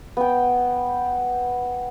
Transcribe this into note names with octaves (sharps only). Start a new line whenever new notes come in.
B3 G5